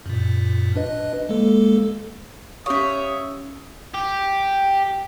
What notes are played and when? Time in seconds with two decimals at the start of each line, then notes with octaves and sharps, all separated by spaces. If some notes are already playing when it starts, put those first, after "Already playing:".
0.06 F#2 A#2
0.76 D4 B4 D#5
1.29 G#3 A#3 A4
2.66 C#4 G4 C#5 E5 F5 D#6
3.94 G4